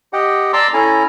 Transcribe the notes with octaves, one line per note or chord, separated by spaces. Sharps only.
G4 D#5 F#5 G5
D5 A5 A#5 C6 D6 E6
C#4 E4 A4 G#5 A#5